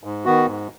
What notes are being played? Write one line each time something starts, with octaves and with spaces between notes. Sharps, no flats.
G#2
D#3 B3 F#4
G#2